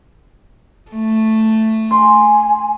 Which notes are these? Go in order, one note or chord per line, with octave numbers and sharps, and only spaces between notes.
A3
G#5 C6